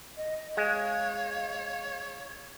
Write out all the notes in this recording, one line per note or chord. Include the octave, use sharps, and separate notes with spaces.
D#5
G#3 C#5 F5